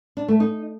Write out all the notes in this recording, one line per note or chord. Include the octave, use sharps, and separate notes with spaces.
D4
A3
D#4